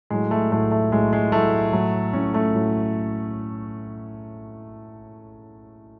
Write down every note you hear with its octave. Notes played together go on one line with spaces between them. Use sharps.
A2 F#3 G#3
A3
A2 F#3 A3
A3
A2 F#3 G#3
G#3
A2 F#3 A3
A2 F#3
A2 F#3 C#4
A3
A2 F#3